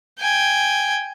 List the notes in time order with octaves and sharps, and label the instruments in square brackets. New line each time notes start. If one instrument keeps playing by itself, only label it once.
[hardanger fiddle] G5 G#5